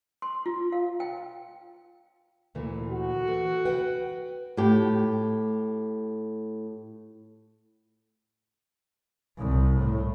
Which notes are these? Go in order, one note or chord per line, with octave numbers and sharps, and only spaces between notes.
C6
F4
F5
G5
D2 A#2 E3
F#4
E3 A4
B4 F#5 G5
A2 G4
C2
A2